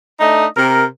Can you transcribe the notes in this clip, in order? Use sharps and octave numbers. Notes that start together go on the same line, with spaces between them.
A3 D4 D#4 D#5
C3 A#4